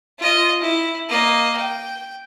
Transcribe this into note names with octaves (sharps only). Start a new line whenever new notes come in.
F4 D#5
E4
A#3 D#5
G5